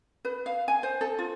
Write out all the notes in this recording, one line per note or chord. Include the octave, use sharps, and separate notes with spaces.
B4
F5
G#5
C5
A4
F4